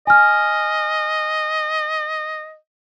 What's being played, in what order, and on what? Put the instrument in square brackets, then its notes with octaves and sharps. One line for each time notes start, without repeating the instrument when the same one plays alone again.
[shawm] D#5 [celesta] G#5 F6